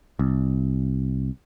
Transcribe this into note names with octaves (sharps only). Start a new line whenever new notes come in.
C2